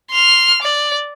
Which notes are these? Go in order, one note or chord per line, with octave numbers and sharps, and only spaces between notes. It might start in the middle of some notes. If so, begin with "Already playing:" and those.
C6 F6
D5